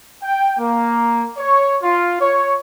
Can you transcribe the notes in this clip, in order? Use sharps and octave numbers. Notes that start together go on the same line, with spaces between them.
G5
A#3
C#5
F4
C#5